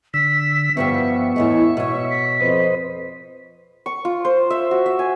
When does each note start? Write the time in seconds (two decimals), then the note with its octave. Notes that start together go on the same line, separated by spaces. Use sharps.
0.14 D3 E6 B6
0.77 G2 F3 G3 B3 E5 C#6
1.36 E2 A2 G#3 E5
1.77 B2 C#5
2.10 B6
2.41 F2 B4 C5 D#5
3.86 C#6
4.05 F4
4.25 C5
4.50 E5
4.71 F#4
4.86 E5
4.99 G#5